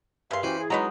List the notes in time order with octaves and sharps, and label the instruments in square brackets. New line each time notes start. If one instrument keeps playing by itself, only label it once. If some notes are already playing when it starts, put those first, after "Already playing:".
[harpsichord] G2 [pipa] C#3 C6 [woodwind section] A#4 E5 F5
[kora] E3 [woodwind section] C#4 F#4 G4 [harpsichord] E4 B4 C5
[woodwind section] G#4
[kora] F#3 G#3 D#4 [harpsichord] C#4 [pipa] B4 C#5 A#5 [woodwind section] D#5